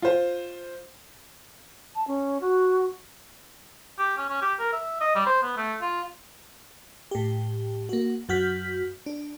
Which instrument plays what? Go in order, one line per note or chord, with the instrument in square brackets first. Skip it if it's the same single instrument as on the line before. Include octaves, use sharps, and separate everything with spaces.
[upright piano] F4 C5
[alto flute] A5
C#4
F#4
[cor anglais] G4
C#4
C#4
G4
A#4
E5
D#5
G3
C5
B3
A3
F4
[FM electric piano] A2 G4
A#3 F#4
F#2 F#3 F#4 F6 G6 B6
D4